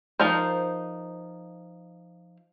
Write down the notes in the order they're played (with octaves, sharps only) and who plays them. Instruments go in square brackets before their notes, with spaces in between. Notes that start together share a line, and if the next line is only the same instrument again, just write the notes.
[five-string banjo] F3 D#4 A#4 C5